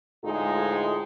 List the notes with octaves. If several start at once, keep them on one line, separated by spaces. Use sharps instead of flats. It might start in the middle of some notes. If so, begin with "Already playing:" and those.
D2 A2 G#3 D#4 F4 G#4